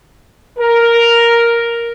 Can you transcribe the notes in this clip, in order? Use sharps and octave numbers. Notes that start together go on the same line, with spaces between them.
A#4